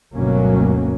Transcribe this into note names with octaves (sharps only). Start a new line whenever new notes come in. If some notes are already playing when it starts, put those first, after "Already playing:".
G1 D2 B2 F#3 A#3 C#4